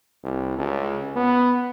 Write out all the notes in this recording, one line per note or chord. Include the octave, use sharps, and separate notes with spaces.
C2
C#2
B3